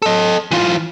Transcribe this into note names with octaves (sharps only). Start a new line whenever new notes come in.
A4 D#5
E3 F4